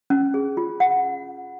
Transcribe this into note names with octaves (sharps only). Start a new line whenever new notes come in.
C#4
G#4
F4
F#5